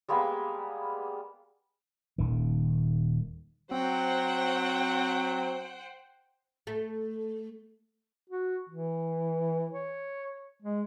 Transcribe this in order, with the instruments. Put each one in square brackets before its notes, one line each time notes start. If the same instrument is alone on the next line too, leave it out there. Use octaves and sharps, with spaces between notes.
[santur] G3 G#3 A#3 B3
[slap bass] D#1 D#3
[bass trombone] F#3 [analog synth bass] C4 [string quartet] C5 F#5 G5
[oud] A3
[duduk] F#4
E3
C#5
G#3